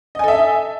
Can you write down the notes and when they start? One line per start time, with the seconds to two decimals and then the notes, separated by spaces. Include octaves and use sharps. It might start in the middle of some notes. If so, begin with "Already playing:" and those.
0.15 D#5
0.19 G#5
0.24 A4
0.28 E5